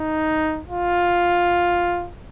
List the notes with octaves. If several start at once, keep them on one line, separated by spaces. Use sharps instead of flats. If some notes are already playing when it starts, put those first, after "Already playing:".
Already playing: D#4
F4